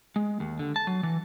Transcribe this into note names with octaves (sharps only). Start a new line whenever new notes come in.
G#3
D#2
D3
A5
F#3
E3